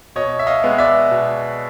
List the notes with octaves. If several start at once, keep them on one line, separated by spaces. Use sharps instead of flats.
B2 C#5 D#5
E5
D#5 F5
G#3 B3
D5 E5
B2